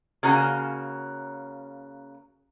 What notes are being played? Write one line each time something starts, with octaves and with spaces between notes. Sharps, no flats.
C#3 A#3 F#4 G#5